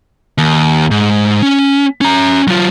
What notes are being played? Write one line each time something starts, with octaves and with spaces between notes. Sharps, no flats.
D#2
G#2
C#4
C#4 A#5
F#3 F4